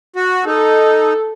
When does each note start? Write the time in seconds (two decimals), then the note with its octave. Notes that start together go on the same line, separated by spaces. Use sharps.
0.16 F#4
0.46 D#4 A4